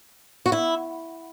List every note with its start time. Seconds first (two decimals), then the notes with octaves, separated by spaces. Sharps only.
0.46 F#4
0.52 E4